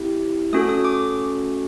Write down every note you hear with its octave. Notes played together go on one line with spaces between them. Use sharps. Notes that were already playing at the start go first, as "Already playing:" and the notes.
Already playing: C4 E4 G4
A3 C#4 F#4 A4 D#6
D#6
D6